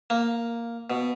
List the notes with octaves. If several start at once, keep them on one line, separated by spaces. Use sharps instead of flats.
A#3
B2